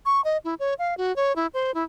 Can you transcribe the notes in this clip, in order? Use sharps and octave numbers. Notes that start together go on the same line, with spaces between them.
C#6
D#5
E4
C#5
F5
F#4
C#5
E4
C5
E4